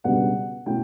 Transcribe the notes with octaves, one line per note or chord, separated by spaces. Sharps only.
C#2 B2 G3 B3 D4 F#5
B2 A3 C#4 E4 G5